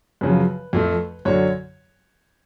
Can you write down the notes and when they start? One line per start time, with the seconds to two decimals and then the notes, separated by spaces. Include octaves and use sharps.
0.21 F#2 C#3 F3 B4
0.73 F2 F3 A3
1.25 F#2 D3 F#3 C#5